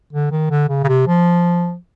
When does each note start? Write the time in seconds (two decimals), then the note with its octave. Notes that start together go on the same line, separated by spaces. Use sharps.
0.13 D3
0.31 D#3
0.50 D3
0.69 C#3
0.84 C#3
0.88 C3
1.07 F3